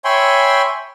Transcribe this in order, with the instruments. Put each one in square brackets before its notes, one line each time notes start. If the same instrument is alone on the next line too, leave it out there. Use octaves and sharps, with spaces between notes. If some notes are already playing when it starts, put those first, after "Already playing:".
[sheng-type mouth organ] C#5 E5 G5 G#5 B5 C6